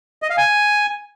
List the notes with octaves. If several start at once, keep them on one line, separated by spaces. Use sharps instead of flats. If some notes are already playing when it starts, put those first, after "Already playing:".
D#5
F5
G#5